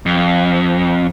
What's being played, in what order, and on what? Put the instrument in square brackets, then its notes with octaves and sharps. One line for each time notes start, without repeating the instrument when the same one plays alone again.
[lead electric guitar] F2